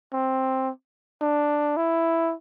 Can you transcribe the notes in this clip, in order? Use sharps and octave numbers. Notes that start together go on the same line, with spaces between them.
C4
D4
E4